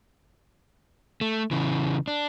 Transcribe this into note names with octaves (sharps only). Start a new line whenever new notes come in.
A3
C#3 E3
D4